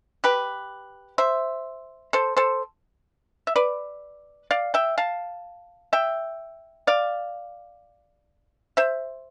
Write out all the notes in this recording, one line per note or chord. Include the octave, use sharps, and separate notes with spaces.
G4 B4
C5 E5
A4 C5
A4 C5
E5
B4 D5
D5 F5
E5 G5
F5 A5
E5 G5
D5 F5
C5 E5